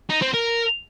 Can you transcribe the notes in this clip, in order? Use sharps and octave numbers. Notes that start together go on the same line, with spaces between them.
D#4
C4
A#4